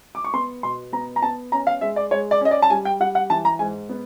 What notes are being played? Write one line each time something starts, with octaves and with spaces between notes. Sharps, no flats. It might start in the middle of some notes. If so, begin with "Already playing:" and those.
D6
C#6
B3 C6
B2 C6
B3 A#5
A#5
B3 A5
C#4 A#5
F5
G#3 E5
D5
G#3 C#5
D5
C#4 D#5
D5
A5
G3 G#5
G5
G3 F#5
F#5
E3 A5
A#5
G#2 G#5
B3